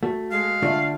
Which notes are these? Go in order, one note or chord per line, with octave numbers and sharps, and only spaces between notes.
A3 F#4
G#3 F5
D3 A3 D4 F4 E5